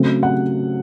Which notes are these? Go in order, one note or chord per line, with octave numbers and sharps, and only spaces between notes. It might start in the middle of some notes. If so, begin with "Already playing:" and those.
Already playing: C#3 F#3 A3 C4
F#5